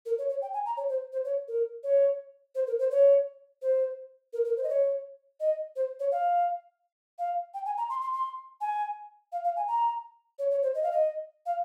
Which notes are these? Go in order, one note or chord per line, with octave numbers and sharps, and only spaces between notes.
A#4
C#5
C#5
G5
G#5
A#5
C#5
C5
C5
C#5
A#4
C#5
C5
A#4
C5
C#5
C5
A#4
A#4
C5
D#5
C#5
D#5
C5
C#5
F5
F5
G5
G#5
A#5
C6
C6
C6
G#5
F5
F5
G#5
A#5
C#5
C#5
C5
D#5
F5
D#5
F5